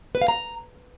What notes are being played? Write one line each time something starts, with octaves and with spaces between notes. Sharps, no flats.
B4
F5
A#5